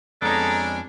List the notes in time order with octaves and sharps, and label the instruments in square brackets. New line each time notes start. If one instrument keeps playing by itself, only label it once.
[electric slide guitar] F2 G#3 B3 [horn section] C#4 D4 [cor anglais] A4 [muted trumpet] A#5